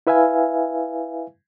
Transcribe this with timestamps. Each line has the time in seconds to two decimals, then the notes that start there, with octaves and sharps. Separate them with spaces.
0.07 E4 B4 E5 F5 G#5